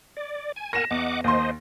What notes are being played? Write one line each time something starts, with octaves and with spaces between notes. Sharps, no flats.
D5
G#5
A#4 F#5 G#5 A#6 E7
E2 D#5 F#5 D6
D#2 C5 D#5 C6